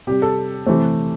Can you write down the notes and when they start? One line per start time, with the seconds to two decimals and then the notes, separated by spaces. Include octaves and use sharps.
0.07 C3 G3 G4
0.22 A4
0.66 C3 E3 A3 C5